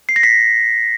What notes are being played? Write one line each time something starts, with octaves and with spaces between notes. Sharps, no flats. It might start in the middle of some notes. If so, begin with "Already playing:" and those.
C7
A#6
B6